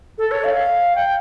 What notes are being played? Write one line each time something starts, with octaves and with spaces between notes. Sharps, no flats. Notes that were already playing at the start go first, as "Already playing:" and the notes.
A4
C#5
F5
G5